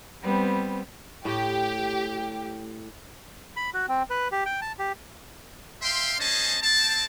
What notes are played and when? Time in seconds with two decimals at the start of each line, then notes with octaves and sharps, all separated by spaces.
0.23 G3 B3 C4
1.25 A2 G4
3.56 B5
3.74 F#4
3.89 C4
4.10 B4
4.32 G4
4.46 G5
4.62 A5
4.79 G4
5.82 E5 F5 G5 C6
6.19 C#4 G#4 C5 D#5 A5
6.62 C4 A5